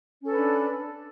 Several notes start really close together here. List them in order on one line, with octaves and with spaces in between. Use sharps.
C#4 A4 B4 D4